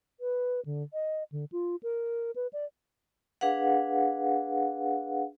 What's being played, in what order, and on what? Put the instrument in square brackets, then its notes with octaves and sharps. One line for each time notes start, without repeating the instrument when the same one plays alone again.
[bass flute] B4
D3
D#5
D3
F4
A#4
B4
D5
[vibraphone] D4 G#4 B4 F5 F#5